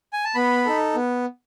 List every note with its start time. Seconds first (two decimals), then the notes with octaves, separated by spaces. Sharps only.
0.13 G#5
0.24 A5
0.35 B3 B5
0.66 D#4 A4
0.95 B3